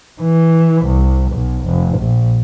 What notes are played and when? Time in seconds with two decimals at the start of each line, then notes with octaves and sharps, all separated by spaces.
0.21 E3
0.85 C2
1.33 B1
1.65 F1
1.98 A#1